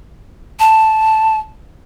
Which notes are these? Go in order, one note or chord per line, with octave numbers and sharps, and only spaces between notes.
A5